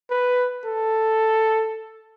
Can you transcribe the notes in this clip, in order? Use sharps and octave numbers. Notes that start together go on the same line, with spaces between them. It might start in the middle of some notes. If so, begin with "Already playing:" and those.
B4
A4